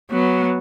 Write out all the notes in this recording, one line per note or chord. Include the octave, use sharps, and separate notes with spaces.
F#3 B3